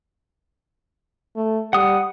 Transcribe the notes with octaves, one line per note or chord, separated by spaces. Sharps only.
A3
G3 F#5 D#6